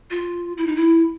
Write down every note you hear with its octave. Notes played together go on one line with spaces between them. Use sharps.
F4
E4
D#4
E4